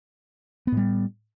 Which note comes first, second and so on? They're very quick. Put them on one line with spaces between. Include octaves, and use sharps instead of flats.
B3 A2 G3